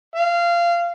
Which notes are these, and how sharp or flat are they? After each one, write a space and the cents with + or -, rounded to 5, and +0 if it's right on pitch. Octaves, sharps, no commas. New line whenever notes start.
F5 -20